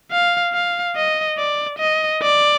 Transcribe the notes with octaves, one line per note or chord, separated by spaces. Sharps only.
F5
F5
D#5
D5
D#5
D5